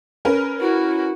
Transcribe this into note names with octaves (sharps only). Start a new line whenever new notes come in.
C#4 A#4 B4
E4 F#4